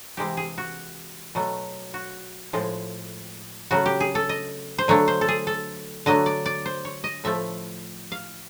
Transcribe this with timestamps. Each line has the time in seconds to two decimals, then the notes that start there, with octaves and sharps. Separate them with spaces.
0.17 C3 E3 G#3 G4
0.37 G#4
0.58 F#4
1.35 B2 F#3 A3
1.94 F#4
2.53 A2 F3 G#3
3.71 C#3 F#3 A3 F#4
3.86 G4
4.00 G#4
4.15 A4
4.29 D#5
4.78 C5
4.88 D3 F#3 A3 C#5
5.08 C5
5.21 A4
5.28 G#4
5.47 A4
6.06 D3 F#3 A3 D#5
6.26 D5
6.46 D5
6.66 C5
6.85 C#5
7.04 D#5
7.24 A2 F3 A3 E5
8.12 F5